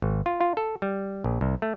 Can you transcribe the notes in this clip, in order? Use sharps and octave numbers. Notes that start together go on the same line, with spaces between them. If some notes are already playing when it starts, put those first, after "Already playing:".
G#1
F4
F4
A4
G3
A#1
C2
A3